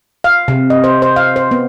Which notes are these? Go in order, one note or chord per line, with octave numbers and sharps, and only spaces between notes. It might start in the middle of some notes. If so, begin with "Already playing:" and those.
F5
C3
D#5
C5
C5
F5
C5
B3